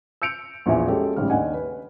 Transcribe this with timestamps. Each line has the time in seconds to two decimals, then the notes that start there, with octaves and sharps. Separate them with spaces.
0.22 E6 G6 C#7 D7 F7
0.66 A#1 E2 E3 F4 E5 G#5
0.88 G#3 C#4 F#4 G4 A4
1.16 A1 G#2 C#3 G3 F6
1.30 D#2 D4 D#4 F#5 G#5
1.54 B4